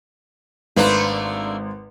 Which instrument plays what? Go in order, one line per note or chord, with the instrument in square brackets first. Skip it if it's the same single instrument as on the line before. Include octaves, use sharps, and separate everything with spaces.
[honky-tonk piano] G#1 [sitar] A3 A#3 D4 [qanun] B4 C5